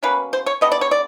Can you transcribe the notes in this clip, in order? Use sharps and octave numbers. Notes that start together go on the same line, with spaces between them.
B2 F#3 A#3 C#4 B4
C5
C#5
D3 G3 B3 D#5
D5
C#5
D5